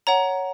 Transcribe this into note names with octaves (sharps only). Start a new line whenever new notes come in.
C#5 F#5 A#5